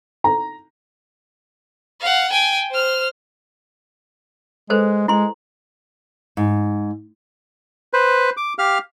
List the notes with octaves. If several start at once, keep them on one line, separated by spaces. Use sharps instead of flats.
A#5
F5 F#5
G5 G#5
C5 F6
G#3 A4 B4 C5
G#3 E4 C6
G#2
B4 C5
D6
G4 F5 F6